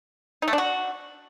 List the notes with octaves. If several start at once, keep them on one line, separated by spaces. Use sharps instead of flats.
D#4
A3
D4
F#4